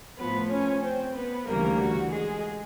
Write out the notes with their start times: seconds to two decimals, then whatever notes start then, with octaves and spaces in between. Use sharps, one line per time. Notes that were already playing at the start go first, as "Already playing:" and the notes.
0.18 A2 F3 B3 B4
0.51 C#4 C#5
0.83 C4 C5
1.15 B3 B4
1.47 D2 C#3 E3 G3 A#3 A#4
1.81 F#4
2.12 G#3 G#4